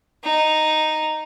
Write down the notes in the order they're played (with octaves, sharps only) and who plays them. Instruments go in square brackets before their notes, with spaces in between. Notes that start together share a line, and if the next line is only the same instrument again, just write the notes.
[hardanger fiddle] D#4